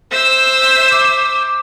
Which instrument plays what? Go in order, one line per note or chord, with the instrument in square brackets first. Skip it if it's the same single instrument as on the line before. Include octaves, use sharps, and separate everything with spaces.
[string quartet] C5 E5 E6
[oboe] D6